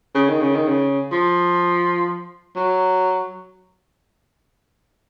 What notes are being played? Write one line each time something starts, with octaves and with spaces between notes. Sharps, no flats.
C#3
D#3
C#3
D#3
C#3
F3
F#3